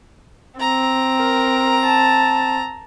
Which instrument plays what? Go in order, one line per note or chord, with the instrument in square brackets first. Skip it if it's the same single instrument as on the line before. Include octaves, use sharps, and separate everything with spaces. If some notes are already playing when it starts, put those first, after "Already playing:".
[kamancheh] C4 [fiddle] A#5
[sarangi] A#4
A5